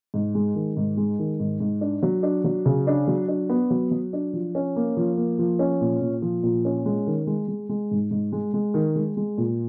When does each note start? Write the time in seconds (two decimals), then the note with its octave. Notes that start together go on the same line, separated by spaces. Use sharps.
0.14 G#2
0.35 G#3
0.55 D#3
0.77 G#2
0.97 G#3
1.19 D#3
1.40 G#2
1.60 G#2
1.81 D4
2.03 F#3
2.23 D4
2.44 F#3
2.66 C#3
2.87 D4
3.08 F#3
3.28 D4
3.49 B3
3.70 F#3
3.91 F#3
4.13 D4
4.33 F3
4.55 C#4
4.76 A#3
4.97 F3
5.17 A#3
5.39 F3
5.59 C#4
5.81 A#2
6.01 A#2
6.22 F3
6.43 A#2
6.65 C#4
6.86 G#3
7.07 D#3
7.27 G#3
7.48 G#3
7.69 G#3
7.91 G#2
8.11 G#2
8.32 G#3
8.54 G#3
8.74 D#3
8.95 G#3
9.17 G#3
9.38 A#2